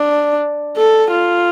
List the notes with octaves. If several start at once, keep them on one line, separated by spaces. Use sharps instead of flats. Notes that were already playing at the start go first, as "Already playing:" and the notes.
Already playing: D4
A4
F4